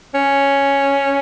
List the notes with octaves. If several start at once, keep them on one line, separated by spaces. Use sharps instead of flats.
C#4